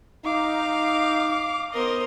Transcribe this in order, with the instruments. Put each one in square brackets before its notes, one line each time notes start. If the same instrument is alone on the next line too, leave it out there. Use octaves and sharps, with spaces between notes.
[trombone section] D#4 [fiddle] F5 [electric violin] D6
[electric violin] B3 D#5 [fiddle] A#4 C5